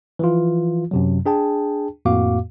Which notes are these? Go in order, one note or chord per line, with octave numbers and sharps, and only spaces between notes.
E3 F3 F4
F#2 C3 F#3
D4 G#4 G5 A5
F2 A2 A#3 F#4 F5 D6